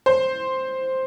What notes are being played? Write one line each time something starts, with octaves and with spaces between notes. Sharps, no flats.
C5